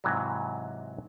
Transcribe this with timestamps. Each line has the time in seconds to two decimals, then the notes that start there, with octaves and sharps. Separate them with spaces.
0.04 G#2 C3 E3 F#3